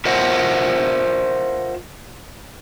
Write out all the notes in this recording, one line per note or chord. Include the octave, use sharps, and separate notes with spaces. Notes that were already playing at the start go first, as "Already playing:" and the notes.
F4 A#4 C5 D#5 E5 F#5